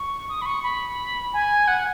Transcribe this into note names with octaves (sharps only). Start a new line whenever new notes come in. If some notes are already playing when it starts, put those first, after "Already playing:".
Already playing: C#6
D#6
B5
C#6
B5
G#5
F#5